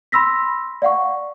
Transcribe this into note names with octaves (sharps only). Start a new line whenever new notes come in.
B5 C6 E6 A#6 B6
D5 F5 F#5 C#6